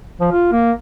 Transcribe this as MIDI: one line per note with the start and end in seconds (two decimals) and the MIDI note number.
0.21 0.29 53
0.32 0.50 65
0.53 0.72 58